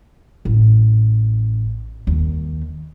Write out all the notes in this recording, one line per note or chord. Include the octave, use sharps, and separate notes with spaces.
A1
D#2